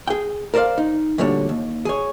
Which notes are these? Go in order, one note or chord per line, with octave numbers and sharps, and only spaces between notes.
G#4 G5
A#4 C5 D5 D#5 F5
D#4
D2 A#2 D3 G3 C#5
D#2
G#4 C#5